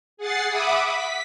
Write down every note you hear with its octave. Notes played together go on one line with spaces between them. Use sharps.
G#4 F#5 A6 C7
E5 F#5 B5 D6 D#6
B6